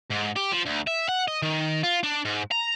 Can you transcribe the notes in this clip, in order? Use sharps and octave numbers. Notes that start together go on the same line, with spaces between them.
G#2
G4
F3
D2
E5
F#5
D#5
D#3
F4
D4
G#2
A#5